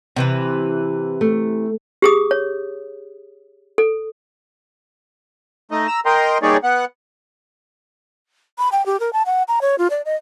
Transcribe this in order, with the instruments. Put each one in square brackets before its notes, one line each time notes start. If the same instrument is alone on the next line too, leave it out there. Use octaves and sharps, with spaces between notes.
[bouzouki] C3 E3 B4
[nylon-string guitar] A3
[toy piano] G4 G#4 D#6
C#5
A4
[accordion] A3 D#4 D#5
A#5 E6
A#4 D#5 G5 A#5 C6
G3 A#3 D#4 G#4 C#5 D5
B3 F#5
[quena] B5
G5
G4
A#4
A5
F#5
A#5
C#5
F4
D5
D#5